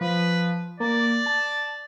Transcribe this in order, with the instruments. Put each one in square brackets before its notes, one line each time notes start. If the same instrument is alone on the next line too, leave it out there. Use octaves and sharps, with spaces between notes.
[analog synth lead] F3 [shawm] B4
[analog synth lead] A#3 [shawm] D5
[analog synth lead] A5